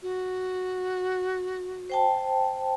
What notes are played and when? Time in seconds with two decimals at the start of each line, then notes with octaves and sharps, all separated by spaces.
0.02 F#4
1.90 C5 G5 A5